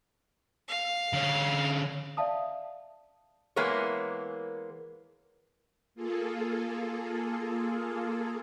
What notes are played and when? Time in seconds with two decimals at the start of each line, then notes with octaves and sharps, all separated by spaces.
0.69 F5
1.13 D3 C#4
2.17 D5 E5 F5 A5 D#6
3.56 E3 G#3 A#3 B3 A#4 C#5
5.95 A#3 F4 G#4 A4